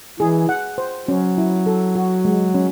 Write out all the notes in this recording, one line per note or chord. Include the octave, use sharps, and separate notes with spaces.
E3 G#4
F#5
C5
F#3 C#4
E4
A4
F#4
G#3
C#4